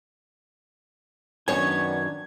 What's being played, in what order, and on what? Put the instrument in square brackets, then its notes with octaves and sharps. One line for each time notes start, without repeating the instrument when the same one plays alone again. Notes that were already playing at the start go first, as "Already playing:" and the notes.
[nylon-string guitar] F#2 C#5 [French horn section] D#3 D4 [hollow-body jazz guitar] B3 G#5 [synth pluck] G#6